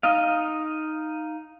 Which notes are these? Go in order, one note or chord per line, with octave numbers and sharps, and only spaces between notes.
D#4 D#5 F5